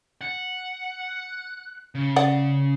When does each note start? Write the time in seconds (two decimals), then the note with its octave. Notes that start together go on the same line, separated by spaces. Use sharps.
0.21 F#5
1.95 C#3
2.16 D5 F#5